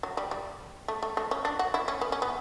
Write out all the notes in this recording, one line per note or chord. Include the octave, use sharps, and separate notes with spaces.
F#3
G3
G3
A3
A3
A3
C#4
D4
F#4
E4
C#4
B3
C#4
B3